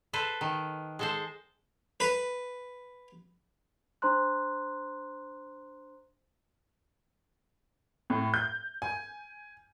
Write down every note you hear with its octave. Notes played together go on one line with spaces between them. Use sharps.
A4 B4 C5
D#3
G#3 A4 C5
B4
D4 C5 A#5 C6 F#6
A2
G6
G#5